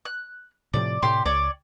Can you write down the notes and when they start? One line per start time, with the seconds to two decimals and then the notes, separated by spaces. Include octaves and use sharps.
0.05 F#6
0.74 A2 C3 F3 D5
1.02 A2 C3 G4 C6
1.25 C#2 C#5 D5